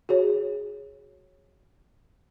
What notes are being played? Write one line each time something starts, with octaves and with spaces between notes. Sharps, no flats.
F#4 G#4 C#5